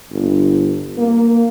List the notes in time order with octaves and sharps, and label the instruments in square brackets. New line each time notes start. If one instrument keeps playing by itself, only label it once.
[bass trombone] G1
A#3